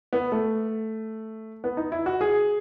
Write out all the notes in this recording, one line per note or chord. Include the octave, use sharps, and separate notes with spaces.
B3
A3
B3
D#4
E4
F#4
G#4